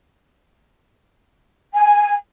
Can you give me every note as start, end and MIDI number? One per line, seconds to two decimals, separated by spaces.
1.75 2.14 80